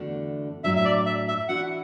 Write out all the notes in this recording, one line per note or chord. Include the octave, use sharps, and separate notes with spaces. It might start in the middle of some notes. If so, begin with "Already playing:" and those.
Already playing: E2 D3 A3 D4 F#4
A2 F#3 D4 E5
E5
D5
E5
E5
E3 D4 F#4 F#5